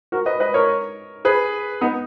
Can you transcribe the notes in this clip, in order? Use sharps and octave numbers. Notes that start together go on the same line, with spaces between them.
F#4 A#4
B4 D#5
B4 D#5
A#4 C#5
G#4 B4
B3 D#4